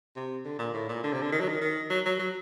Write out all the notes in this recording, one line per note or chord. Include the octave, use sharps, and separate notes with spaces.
C3
D3
A#2
A2
A#2
D3
C3
D3
D#3
F#3
D#3
D#3
F#3
F#3
F#3